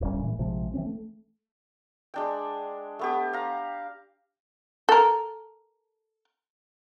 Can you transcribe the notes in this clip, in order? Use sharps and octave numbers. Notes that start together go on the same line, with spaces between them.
D1 G1 G3 C#4
A#2 E3 G#3
A#1 C3 F3 G#3
E3 F#3 C4 C#4
A3
G#3 D4 G5
A3 B3 G4
F5 A#5
A4 A#4